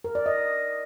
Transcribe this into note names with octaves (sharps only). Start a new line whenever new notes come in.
A#4
D5
D#5